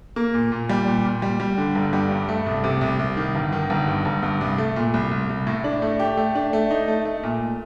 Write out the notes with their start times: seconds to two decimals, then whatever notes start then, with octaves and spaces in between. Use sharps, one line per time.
0.16 A#3
0.34 A#2
0.52 A#2
0.69 G3
0.87 A#2
1.05 A#2
1.22 G3
1.40 G3
1.58 D3
1.75 G1
1.93 G3
2.11 G2
2.28 A3
2.46 C2
2.64 C3
2.81 C2
2.99 C2
3.17 D#3
3.35 G1
3.52 D#3
3.70 G1
3.88 G2
4.05 G1
4.23 G2
4.41 C2
4.58 A3
4.76 A#2
4.94 C2
5.11 C2
5.29 C2
5.47 A2
5.64 D4
5.82 A3
6.00 G4
6.17 A3
6.35 D4
6.53 A3
6.70 D#4
6.88 A3
7.05 A3
7.23 A#2